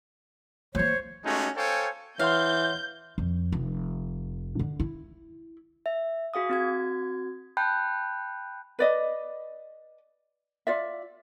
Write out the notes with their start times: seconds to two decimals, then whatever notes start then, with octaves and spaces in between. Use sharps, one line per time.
0.75 E3 A#3 C5 C#5
1.25 G#3 A3 C#4 D#4 F#4 G4
1.57 A4 C5 C#5 F5 G5 G#5
2.19 E3 C#5 F5 F#5 C6 G6
3.18 F2
3.52 F1
4.59 D3
4.80 E4
5.86 E5
6.34 F#4 G#4 F5 D#6
6.49 C4 F#4 G#6
7.57 G5 A5 B5 F#6 G6
8.79 B4 D5 D#5
10.67 F4 D5 E5